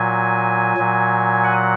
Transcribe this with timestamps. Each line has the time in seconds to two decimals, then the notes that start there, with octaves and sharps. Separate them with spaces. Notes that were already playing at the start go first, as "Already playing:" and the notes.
Already playing: A#2 F#3 G#5
0.77 A#2 F#3
1.44 F#5